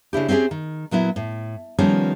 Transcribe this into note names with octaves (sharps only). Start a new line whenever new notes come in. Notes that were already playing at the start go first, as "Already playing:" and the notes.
C#3 D4 E4 G4
C4 C#4 E4 G4 G#4
D#3
A#2 F#3 B3 E4
A2
D#3 F3 G3 B3 C#4 A#4